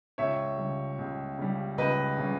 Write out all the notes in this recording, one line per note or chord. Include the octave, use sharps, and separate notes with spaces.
C#2 C#5 E5
C#3 G3
C#2
C#3 G3
C#2 B4 D#5
C#3 G3